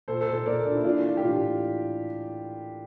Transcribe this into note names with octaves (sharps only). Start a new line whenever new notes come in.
A#2 A4 C5
A4 C5
A#2
A4 C5
A#2 A#4 D5
A#2 D4
E4
E3 D4 F4
E3
G4
A2 D4 F4